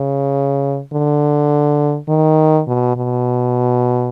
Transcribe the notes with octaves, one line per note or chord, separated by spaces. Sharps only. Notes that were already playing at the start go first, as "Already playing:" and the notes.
Already playing: C#3
D3
D#3
B2
B2